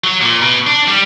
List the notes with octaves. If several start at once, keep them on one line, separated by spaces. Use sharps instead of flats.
F#3
A#2
B2
D4
G3